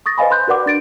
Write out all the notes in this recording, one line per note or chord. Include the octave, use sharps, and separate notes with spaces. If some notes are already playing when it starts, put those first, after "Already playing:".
C#6 D#6 A6 A#6
B4 C5 D#5 F5 G#5 B5
B5 C6 F#6 G6
F#4 A#4 B4 D5 F#5 D6
D4 A6 D7